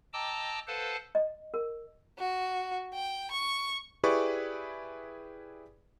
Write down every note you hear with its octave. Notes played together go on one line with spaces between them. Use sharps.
D#5 G5 A5 A#5 D6 E6
A4 B4 C5 F5 F#5 A5
D#5
A#4
F#4
G5
C#6
E4 G4 G#4 B4 D5 C#6